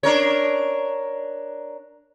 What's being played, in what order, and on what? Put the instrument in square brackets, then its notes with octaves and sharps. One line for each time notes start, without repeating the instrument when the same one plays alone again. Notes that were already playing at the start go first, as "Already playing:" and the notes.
[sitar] D4 A#4 C#5